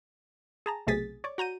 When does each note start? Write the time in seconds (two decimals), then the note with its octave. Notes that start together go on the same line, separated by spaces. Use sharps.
0.66 G#4 A5 A#5
0.87 B1 C3 A3 G#4 A6 B6
1.24 C#5 D5
1.38 F#4 A#5 G6 D#7